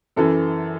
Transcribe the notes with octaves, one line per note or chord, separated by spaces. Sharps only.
F#2 E3 A4